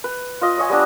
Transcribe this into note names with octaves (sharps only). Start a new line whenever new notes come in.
B4
F4 D#5
C#5 D#5 G#5
G3 B3 D4